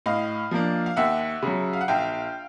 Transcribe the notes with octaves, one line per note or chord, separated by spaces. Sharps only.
A2 D#5 F5
F3 A#3 D4
F5
D#2 E5 F#5
C#3 F#3
F5
F#5
A#1 F5 G5